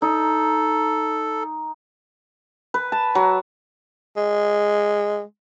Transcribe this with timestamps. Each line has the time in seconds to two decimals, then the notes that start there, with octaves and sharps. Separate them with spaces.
0.02 D#4 A4
2.74 B4
2.92 A5
3.15 F#3
4.17 G#3